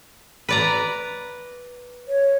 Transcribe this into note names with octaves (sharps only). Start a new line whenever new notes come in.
B4 D5 A#5
C#5